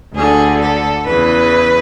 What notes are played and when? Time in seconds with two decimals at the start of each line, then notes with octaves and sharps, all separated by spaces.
0.14 D2 D3 G#4
0.60 A4
1.06 E2 C#3 E3 B4